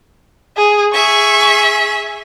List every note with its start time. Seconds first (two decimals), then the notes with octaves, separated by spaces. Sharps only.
0.57 G#4
0.93 G#4 E5 C#6